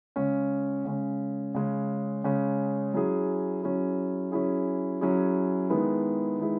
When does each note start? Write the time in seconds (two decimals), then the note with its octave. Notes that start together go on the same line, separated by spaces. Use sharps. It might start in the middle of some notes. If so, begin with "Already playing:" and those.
0.16 C#3 G#3 C#4
0.85 C#3 G#3 C#4
1.55 C#3 G#3 C#4
2.24 C#3 G#3 C#4
2.94 F#3 C#4 E4 G#4
3.63 F#3 C#4 E4 G#4
4.32 F#3 C#4 E4 G#4
5.01 F#3 C#4 E4 G#4
5.70 D#3 G#3 B3 E4 G#4
6.39 D#3 G#3 B3 E4 G#4